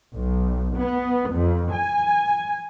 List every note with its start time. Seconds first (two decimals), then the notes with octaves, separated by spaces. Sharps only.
0.12 B1
0.77 B3
1.31 F2
1.72 G#5